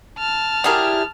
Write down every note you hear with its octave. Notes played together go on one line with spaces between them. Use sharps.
A5 F6
F#3 D4 E4 G4 G#4 A#4